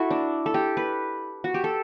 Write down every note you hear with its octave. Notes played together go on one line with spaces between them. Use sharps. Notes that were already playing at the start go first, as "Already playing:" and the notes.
Already playing: E4 F#4 A4
D4
A4
G4
B4
F#4
G4
A4